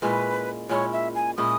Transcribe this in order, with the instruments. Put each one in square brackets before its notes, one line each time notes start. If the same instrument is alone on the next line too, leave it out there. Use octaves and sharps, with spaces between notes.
[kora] A#2 G#3 C#4 E4 [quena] B4
[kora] A#2 G#3 C#4 E4 [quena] C#5
[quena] E5
G#5
[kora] A#2 G#3 C#4 E4 [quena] D#6